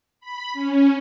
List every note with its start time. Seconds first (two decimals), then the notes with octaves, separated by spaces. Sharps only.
0.20 B5
0.53 C#4